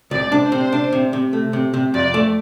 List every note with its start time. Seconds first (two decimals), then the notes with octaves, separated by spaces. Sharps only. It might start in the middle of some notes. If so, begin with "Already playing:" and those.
0.11 C2 D5
0.32 D4
0.42 C5
0.52 C3
0.73 D4
0.92 C3
1.13 C3
1.33 A3
1.53 C3
1.74 C3
1.94 F2 D5
2.14 A3